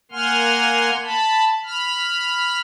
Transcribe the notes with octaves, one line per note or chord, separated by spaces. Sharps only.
A#3 F#5 G#5 C6 F6
A5 B5
B5 F6